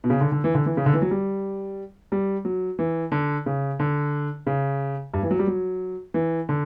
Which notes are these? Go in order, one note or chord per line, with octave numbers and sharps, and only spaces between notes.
B2
C#3
D3
D3
E3
D3
E3
C#3
D3
E3
F#3
G3
G3
F#3
E3
D3
C#3
D3
C#3
G2
E3
F#3
G3
F#3
E3
D3